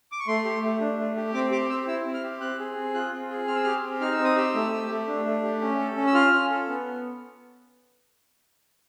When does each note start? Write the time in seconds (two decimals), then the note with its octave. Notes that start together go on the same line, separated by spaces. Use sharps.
0.12 D6
0.20 C#6
0.27 A3 C6
0.45 G4
0.63 A3
0.81 D4
0.99 A3
1.16 G4
1.34 C4 D6
1.51 G4 D6
1.70 C4 E6
1.87 E4 E6
2.05 C4
2.14 F6
2.23 G4
2.41 C4 F#6
2.59 G#4
2.77 C4
2.94 F4 F#6
3.12 C4
3.30 G#4
3.47 C4 F6
3.56 E6
3.63 G4 F6
3.83 C4
4.01 D#4 F6
4.12 E6
4.19 C4
4.24 D#6
4.36 G4 E6
4.54 A3
4.72 G4
4.90 A3
5.07 D4
5.25 A3
5.43 G4
5.61 C#4
5.79 A4
5.96 C#4
6.07 E6
6.14 F4 F6
6.33 C#4
6.50 A4
6.68 B3